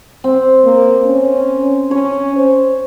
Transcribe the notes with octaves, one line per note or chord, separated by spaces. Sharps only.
C4
A#3
C#4
C#4 C#5
C5